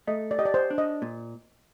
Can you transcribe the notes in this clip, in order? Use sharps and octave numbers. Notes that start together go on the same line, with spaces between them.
A3 D#5
D5
G4 D#5
D5
C5
D4
D#5
A#2